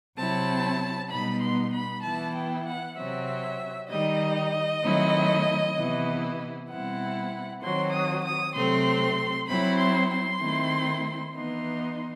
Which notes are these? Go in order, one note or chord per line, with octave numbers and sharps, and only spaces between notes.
C3 F#3 C4 E4 A5
B2 G3 B3 D#4 B5
C6
B5
E3 B3 E4 A5
G5
F#5
C3 F#3 C4 E5
D#3 G3 D#4 D#5
D#3 F#3 A3 C4 E4
C3 E3 B3 E4
B2 G3 C4 E4 F#5
D#3 F#3 C4 C6
D#6
D#6
C3 F#3 A3 C4 C6
F#3 C4 E4 B5
C6
C6
D#3 A3 C4 E4
E3 B3 D#4 C6